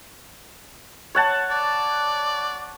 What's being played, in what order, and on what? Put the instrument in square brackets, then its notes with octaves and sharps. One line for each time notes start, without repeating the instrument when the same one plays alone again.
[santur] C#5 F#5 A5
[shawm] D5